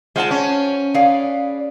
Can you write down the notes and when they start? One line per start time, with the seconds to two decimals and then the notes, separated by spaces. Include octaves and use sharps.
0.16 G#3 D4 F4 C5 F#5 A5
0.31 C#4 F5
0.94 G#4 B4 D5 F5